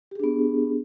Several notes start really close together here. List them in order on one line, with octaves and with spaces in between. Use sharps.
G4 G#4 D4 B3